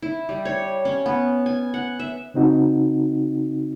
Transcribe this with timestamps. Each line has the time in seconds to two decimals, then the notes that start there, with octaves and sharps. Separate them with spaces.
0.02 E4
0.29 G3
0.45 C#5
0.85 C#4
1.06 B3
1.46 G#5
1.74 F#5
2.00 E5
2.34 C#3 C4 D#4 F#4